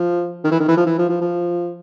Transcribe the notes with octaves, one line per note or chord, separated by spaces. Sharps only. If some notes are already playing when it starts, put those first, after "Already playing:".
Already playing: F3
D#3
E3
D#3
E3
F3
E3
F3
F3
F3